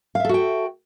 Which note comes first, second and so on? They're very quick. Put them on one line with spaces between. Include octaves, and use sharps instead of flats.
F5 E5 A4 F#4 G5